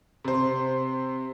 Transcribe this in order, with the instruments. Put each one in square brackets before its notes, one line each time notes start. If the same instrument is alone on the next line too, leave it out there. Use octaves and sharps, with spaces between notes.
[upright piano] C3 C5